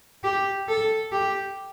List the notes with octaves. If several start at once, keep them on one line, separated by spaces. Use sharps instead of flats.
G4
A4
G4